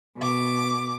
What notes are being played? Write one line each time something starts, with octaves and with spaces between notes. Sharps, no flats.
B2 D6